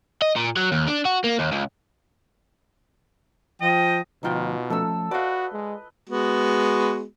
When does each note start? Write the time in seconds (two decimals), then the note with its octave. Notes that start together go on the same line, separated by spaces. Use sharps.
0.22 D#5
0.36 A#2
0.57 F#3
0.72 D#2
0.87 D4
1.05 F#4
1.24 A#3
1.39 D#2
1.52 C#2
3.61 F3 D#5 G5
4.23 D2 B2 F3 D#4 F4 G5
4.70 F3 A3 C#4 A4 E6
5.11 F#4 B4 D5 D#5 F5
5.53 G#3
6.09 G#3 B3 F#4